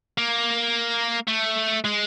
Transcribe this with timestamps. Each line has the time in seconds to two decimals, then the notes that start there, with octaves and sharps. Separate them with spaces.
0.18 A#3
1.28 A3
1.85 G#3